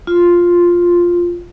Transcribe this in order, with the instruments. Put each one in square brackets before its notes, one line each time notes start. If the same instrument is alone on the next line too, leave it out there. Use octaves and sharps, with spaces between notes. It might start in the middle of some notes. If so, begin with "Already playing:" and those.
[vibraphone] F4